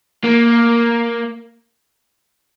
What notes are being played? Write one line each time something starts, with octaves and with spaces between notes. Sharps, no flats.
A#3